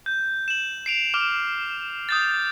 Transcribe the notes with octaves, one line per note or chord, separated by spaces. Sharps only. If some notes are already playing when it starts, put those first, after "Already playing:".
G6
E7 F#7
C7 D7 F7
D6 F6
D#6 G6 A6